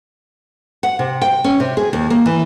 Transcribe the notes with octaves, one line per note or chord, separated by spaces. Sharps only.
F#5
C3
G5
C#4
C3
G#4
D#2
A#3
E3